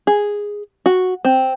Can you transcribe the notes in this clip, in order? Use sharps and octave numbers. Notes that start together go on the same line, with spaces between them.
G#4
F#4
C4